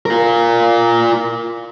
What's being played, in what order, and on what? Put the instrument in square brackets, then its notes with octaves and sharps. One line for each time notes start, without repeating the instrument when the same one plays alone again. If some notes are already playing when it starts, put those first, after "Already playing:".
[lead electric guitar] F4 A#4